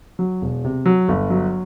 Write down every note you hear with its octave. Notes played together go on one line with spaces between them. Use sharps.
F#3
E1
C3
F#3
G1
F#3